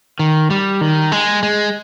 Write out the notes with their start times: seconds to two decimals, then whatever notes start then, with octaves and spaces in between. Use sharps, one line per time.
0.19 D#3
0.50 G3
0.81 D#3
1.12 G#3
1.43 G#3